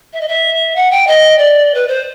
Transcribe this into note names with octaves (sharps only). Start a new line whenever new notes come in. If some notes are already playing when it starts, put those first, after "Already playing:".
E5
D#5
E5
F#5
G5
D#5
D5
B4
C5